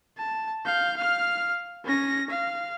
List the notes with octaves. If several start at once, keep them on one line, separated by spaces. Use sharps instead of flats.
A5
F5 G6
F5 F6
C#4 A#6
F5